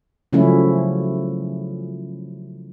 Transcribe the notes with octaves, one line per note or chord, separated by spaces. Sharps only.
C#3 F3 F#3 A3 C#4 E4